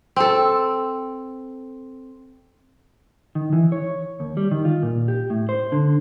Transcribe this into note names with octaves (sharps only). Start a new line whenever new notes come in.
C4 A4
D#3
E3
C#5
D#2
G3
D#3
F4
A#2
G4
A2
C5
D3